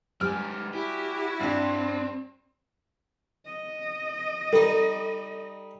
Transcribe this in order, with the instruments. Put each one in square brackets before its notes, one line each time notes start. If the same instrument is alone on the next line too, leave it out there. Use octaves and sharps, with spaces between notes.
[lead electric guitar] G#2 G4 [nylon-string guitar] G3 [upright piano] G#5 F6
[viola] E4 F#4 [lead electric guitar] G4
[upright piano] G2 D4 [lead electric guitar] C4
[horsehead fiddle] D#5
[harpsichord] G3 D#4 [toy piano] A4